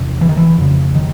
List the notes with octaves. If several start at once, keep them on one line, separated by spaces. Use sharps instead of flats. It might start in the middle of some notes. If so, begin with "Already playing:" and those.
Already playing: E2 C3
E3
D#3
E3
F2 C#3
D#3